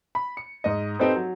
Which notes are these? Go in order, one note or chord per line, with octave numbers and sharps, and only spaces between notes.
B5
C#7
G#2 D#5
C4 D#4 G4 A4 B4 C5
F#3